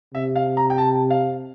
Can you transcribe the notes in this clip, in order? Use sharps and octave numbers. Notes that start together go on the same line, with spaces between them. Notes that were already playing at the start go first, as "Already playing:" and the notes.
C3 E5
F5
A#5
G5
A5
F5